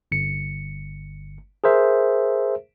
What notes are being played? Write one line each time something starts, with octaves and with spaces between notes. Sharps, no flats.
G1 C#7
G#4 A#4 C5 E5